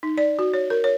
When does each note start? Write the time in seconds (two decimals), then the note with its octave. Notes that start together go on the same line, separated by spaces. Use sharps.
0.03 D#4
0.18 D5
0.39 F#4
0.54 C#5
0.70 A#4
0.84 C#5